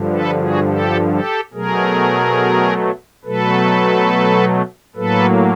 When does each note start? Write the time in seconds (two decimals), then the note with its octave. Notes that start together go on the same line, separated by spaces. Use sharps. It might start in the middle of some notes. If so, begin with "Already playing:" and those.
Already playing: G2 D3 F3
0.11 A4 B4
0.40 F#4 G#4
0.67 G4 A4
1.11 G4 A4
1.53 B2 F#3 A3 G#4 A#4
3.25 B2 F#3 A3 A4 B4
4.96 A2 F#3 A#3 A4 B4